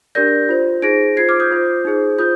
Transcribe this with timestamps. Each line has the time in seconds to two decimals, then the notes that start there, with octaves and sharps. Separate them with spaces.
0.15 D4 G4 A#4 D5 G6 A#6
0.49 F4 C5
0.82 D#4 G#4 C5 A#6 D7
1.17 F4 C5 G#6 C7
1.29 D6 F6
1.40 D#6 G6
1.51 F4 C5
1.85 D#4 G#4 C5
2.18 F4 C5 D#6 G6